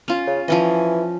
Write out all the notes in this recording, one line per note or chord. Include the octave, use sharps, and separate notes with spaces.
C#4 F4
C#3
E3 F3 C#4 D#5